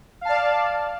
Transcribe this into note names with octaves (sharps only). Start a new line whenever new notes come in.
D5 F5 A5